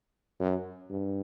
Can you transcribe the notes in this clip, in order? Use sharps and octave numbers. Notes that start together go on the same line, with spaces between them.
F#2
G2